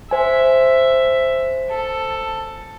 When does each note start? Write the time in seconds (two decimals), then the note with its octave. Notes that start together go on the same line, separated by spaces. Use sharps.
0.11 C5 E5 G#5
1.71 A4